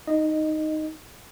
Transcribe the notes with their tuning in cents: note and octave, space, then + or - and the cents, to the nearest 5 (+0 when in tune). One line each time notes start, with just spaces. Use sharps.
D#4 +0 D#5 -10